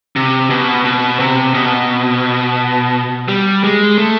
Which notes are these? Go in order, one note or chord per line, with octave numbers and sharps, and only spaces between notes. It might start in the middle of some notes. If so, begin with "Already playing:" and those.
C3
B2
B2
C3
B2
G3
G#3
A3